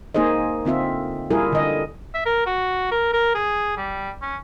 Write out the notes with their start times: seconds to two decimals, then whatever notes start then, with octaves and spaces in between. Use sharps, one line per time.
0.14 A#3 D#4 G#4 C5 D#5
0.65 D3 C4 F4 E5
1.30 G3 E4 F4 G#4 A#4
1.52 D3 D#5
2.15 E5
2.26 A#4
2.46 F#4
2.91 A#4
3.13 A#4
3.35 G#4
3.77 G3
4.22 C#4